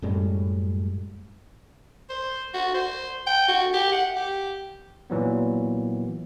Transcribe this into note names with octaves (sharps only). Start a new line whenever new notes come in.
F#2 A2 G3 G#3
C5
F#4
C5
G5
F#4
G4
F#5
G4
A#2 E3 F#3 B3